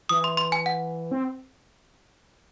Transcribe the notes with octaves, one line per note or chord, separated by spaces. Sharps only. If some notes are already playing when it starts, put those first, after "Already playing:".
E3 D#6
C6
C6
G#5
F#5
C4